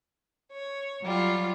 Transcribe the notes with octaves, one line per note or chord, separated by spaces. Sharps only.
C#5
F#3 G3 F4